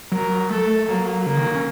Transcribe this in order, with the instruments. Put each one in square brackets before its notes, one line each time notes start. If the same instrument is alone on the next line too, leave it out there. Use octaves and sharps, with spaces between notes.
[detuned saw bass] F#3 [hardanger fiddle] A#4
[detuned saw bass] A3 [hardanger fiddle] A4
[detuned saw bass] F#3 [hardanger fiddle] A#3
[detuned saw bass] C#3 [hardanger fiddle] A#3
[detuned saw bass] D#3
F#3
C#4